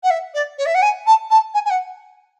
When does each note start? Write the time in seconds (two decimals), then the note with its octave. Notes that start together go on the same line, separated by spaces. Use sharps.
0.03 F#5
0.10 E5
0.34 D5
0.58 C#5
0.66 E5
0.74 F#5
0.82 G#5
1.06 A5
1.30 A5
1.54 G#5
1.65 G#5
1.70 F#5